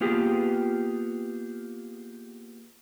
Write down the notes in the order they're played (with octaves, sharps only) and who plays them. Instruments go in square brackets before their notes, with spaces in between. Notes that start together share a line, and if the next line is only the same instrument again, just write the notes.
[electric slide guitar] A#3 B3 F4 G4 G#4